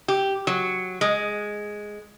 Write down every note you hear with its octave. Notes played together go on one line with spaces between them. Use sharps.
G4
F#3
G#3